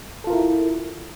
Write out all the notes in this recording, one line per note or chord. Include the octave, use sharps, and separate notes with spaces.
E4 F4 A4 A#4